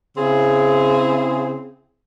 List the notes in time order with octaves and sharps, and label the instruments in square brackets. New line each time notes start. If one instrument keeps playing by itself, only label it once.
[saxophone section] C#3 C4 E4 G#4